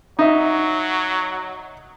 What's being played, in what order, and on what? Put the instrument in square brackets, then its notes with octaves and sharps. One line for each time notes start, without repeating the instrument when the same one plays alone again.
[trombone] F#3 [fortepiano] D#4 E5